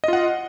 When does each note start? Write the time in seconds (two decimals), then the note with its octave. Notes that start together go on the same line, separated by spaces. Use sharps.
0.04 D#5
0.08 F4
0.13 F#5